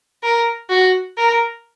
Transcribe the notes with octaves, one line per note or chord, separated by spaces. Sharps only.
A#4
F#4
A#4